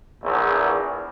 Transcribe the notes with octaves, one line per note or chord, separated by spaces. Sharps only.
A#1 E2